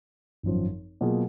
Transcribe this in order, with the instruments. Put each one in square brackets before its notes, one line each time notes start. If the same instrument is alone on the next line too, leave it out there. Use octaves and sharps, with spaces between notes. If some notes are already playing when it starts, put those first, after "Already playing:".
[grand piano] G#1 F#2 F3
B2 F#3 A#3 F4 G#4